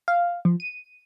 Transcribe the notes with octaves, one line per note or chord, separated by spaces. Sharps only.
F5
F3
D#7